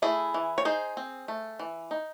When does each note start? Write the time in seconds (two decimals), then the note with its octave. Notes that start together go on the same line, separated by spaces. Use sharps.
0.02 A3 E4 G#4
0.34 E3
0.58 C#5
0.65 D#4 G#4 C5
0.97 C4
1.28 A3
1.60 E3
1.91 D#4